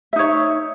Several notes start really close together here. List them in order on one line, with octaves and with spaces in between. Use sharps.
E5 D#4 C#5